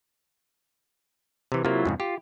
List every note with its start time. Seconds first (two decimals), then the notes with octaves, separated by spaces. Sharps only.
1.52 C3 E3
1.65 C3 F#3 A#3 E4 F4
1.85 F2 G#2 C#3
2.00 F4 G4